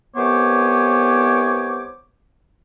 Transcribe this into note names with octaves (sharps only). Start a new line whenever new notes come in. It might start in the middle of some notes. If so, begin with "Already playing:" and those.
C2 E3 B3 C5 C#5 D6